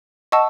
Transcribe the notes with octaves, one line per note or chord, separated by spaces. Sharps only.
D#5 F#5 A5 C#6 E6